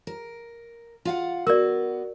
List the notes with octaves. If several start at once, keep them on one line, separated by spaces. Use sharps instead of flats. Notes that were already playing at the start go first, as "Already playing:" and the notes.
A#4
F4 F5 F#5
B3 F#4 A#4 D5